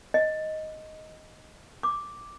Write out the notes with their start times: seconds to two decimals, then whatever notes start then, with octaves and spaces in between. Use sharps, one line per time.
0.14 D#5
1.83 D6